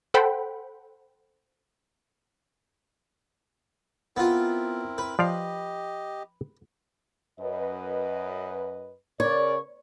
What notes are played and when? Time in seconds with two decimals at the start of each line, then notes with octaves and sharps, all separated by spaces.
0.14 A4 C5 F#5 G5 B5
4.17 B3 C4 E4 F4 A#4
4.98 B4
5.19 F3 G4 D5 D#5 F5
7.39 F#2 B4 D#5
9.20 C#3 A#4 C#5 D5